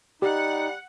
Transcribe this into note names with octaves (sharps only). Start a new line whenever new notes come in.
G3 D#4 G4 F#5